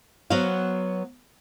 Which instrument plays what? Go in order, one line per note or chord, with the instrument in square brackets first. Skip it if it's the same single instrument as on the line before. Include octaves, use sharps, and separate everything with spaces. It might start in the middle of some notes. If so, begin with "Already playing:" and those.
[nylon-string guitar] F#3 B3 F#4 C5 F5